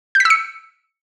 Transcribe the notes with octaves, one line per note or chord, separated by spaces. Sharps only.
G6
B6
E6
C#7